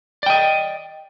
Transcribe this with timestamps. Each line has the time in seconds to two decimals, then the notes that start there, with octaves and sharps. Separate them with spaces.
0.23 D5
0.26 G5
0.30 D#5